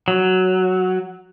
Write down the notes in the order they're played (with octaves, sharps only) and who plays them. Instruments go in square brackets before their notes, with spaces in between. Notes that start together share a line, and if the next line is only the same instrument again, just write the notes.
[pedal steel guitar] F#3